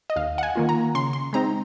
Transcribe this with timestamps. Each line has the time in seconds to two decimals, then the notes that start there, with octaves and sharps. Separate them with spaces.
0.10 D#5
0.16 D#2 F5
0.38 F#5
0.43 G#5
0.56 D#3 A#3 F4
0.69 A#5
0.95 C#3 C6
1.13 C6
1.33 G#3 C4 D#4 A#5